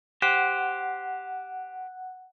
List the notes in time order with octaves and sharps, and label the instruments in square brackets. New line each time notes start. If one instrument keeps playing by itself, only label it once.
[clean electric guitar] G4 C5 [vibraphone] F#5 [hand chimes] F#6